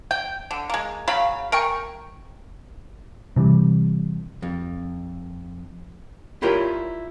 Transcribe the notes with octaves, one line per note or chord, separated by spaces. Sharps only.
G5
D3
G#3 A#3
C#3 F#3 F5 B5
A#4 G5 G#5 C#6
C3 E3 G3
F2
E4 F4 G4 A#4 C#5 D5